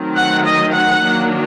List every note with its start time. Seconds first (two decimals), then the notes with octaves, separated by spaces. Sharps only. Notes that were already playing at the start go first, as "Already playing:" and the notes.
Already playing: D#3 F#3 A3 C4
0.16 F#5
0.44 D#5
0.72 F#5
1.01 D#3 F#3 A#3 D4